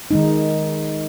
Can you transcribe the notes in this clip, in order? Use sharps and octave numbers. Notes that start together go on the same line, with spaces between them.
D#3 G#3 D#4